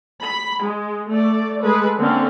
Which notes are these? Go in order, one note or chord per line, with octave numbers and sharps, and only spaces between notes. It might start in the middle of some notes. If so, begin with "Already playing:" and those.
B5
G#3
A3 D5
G#3 G#4 A4 B4
D3 A#3 C4 C#4